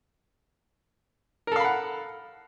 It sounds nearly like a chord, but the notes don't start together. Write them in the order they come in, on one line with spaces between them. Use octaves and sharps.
A#4 A4 F5 B5 F#5